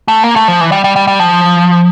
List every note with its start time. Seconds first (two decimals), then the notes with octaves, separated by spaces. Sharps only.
0.08 A3
0.24 A#3
0.36 A3
0.48 F3
0.61 E3
0.72 G3
0.84 G3
0.96 G3
1.07 G3
1.19 F3